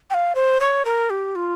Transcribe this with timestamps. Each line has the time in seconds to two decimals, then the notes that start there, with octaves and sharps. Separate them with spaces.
0.10 G5
0.14 F5
0.35 C5
0.60 C#5
0.85 A#4
1.10 G4
1.35 F4